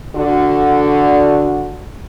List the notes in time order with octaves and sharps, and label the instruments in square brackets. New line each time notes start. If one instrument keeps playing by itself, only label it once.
[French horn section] D3 F#4